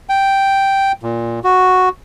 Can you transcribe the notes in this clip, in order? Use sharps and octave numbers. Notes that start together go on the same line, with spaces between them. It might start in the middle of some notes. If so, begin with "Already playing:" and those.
G5
A#2
F#4